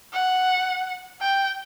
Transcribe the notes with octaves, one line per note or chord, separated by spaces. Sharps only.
F#5
G5